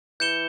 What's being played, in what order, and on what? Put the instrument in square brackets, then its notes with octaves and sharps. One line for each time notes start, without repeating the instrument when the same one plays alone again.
[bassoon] E3 [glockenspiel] G6 C#7 E7 G7